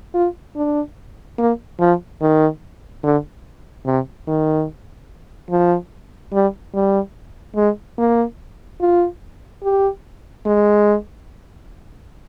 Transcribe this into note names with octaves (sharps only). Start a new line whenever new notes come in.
F4
D4
A#3
F3
D#3
D3
C3
D#3
F3
G3
G3
G#3
A#3
F4
G4
G#3